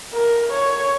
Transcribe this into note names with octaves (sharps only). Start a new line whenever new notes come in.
A#4
C#5